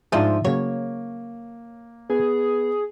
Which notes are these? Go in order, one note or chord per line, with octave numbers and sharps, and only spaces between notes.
G#2 F3 D4 F4 G#4 C5 E5
C#3 F#3 A#3 C#5
B3 G#4